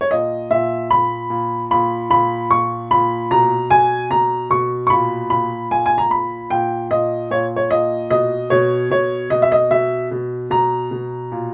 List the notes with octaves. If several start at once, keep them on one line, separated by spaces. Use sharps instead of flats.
C#5
A#2 D#5
A#2 E5
A#2 B5
A#2
A#2 B5
A#2 B5
A#2 C#6
A#2 B5
B2 A#5
B2 G#5
B2 A#5
B2 C#6
C#6
A#2 B5
A#2 B5
A#2 G#5
G#5
A#5
A#2 B5
A#2 G5
A#2 D#5
A#2 C#5
C#5
A#2 D#5
B2 D#5
B2 C#5
B2 C#5
B2 D#5
E5
D#5
B2 E5
B2
B2 A#5
B2
A#2